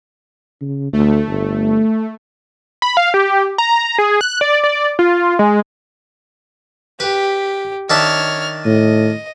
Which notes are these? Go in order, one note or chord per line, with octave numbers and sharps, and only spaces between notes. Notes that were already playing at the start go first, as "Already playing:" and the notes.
C#3
D2 A3
G1
B5
F5
G4
A#5
G#4
F#6
D5
D5
F4
G#3
G4 B4
D#3 D4 C#5 E5 F6
A2 D#5